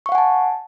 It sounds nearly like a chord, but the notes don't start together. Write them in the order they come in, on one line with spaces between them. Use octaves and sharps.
C#6 F5 F#5 G#5 A5